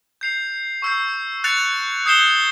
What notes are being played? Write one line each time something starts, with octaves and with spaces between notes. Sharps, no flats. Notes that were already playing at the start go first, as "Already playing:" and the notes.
G6 C7 F7
C#6 E6 G6 C7
F#6 A6 C#7 F7
D#6 G6 C7 E7 G7